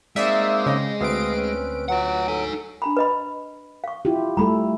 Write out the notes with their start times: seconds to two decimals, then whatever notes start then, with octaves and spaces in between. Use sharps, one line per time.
0.16 G#3 A#3 C4 D#4 D5 E5
0.66 C#3 D#5
1.01 D2 C4 B4 D#5 F5 D7
1.36 C4 C#4
1.89 F#3 F4 B4 F#5
2.28 D#4 A4 G#5
2.82 D4 A#5 B5
2.97 B4 D#5 B5
3.84 F5 C#6
4.05 E4 F4 G4
4.37 G3 A3 A4 A#5 B5